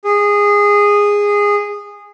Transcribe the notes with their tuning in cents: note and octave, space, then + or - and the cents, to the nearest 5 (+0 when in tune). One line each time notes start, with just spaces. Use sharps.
G#4 -15